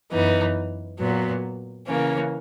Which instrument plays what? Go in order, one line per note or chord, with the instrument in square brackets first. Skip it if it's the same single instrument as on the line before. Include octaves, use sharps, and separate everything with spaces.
[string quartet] F#2 E3 B3 D#4
A#2 F#3 B3
C#3 E3 A#3 C#4